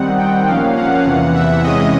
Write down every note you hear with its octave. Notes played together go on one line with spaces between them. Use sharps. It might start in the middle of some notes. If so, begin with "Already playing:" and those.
Already playing: D#3 G3 C4 D#4 F#5
G5
A#2 F3 A#3 C#4 F5
F#5
E2 C3 E3
E5
C3 E3 G#3 C#4 D#5